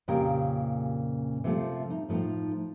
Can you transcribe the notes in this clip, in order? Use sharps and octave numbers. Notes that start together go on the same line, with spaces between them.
F2 A#2 C#3 G4 A#4 G5
C3 F3 A3
D#4
A2 F3 A3 D#4